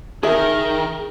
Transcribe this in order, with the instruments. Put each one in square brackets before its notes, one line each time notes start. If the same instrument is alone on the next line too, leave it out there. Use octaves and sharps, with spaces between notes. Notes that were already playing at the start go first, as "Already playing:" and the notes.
[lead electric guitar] D#3 [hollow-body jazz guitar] G#4 E5 [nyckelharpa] A#4